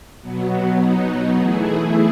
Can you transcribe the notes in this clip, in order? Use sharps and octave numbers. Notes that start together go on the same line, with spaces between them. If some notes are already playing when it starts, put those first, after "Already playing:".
B2 F#3 B3
B2 F#3 B3 D#4
E3 A3 E4 G#4